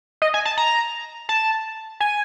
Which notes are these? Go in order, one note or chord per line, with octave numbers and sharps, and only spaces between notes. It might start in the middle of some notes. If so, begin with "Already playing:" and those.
D#5
G#5
A5
A#5
A5
G#5